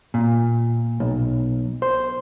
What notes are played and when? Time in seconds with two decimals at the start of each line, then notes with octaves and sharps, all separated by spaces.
0.14 A#2
1.00 B1
1.82 C5